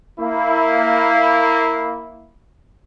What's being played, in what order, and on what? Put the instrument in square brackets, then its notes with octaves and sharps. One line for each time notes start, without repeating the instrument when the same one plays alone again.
[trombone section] A#3 E4